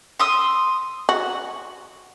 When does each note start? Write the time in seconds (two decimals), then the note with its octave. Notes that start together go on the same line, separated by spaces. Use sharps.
0.19 C6 D#6 E6
1.09 F#4